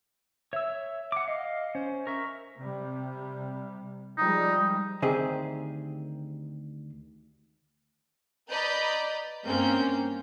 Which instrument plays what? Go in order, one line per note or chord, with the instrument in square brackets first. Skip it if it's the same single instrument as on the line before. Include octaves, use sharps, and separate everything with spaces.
[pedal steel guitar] C#5 E6 [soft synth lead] E5
[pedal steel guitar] F#5 D6
[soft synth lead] D#5 [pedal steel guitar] F5
[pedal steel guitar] C#4 [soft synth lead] C5
[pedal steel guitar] A#4 E5 [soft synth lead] C#6
[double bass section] C3 G3
[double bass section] F3 G3 G#3 [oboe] D#4
[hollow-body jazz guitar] D2 D#3 C4 G4 G#4 D#5
[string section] B4 D5 D#5 A#5 B5 G6
G2 A#3 C4 C#4 G6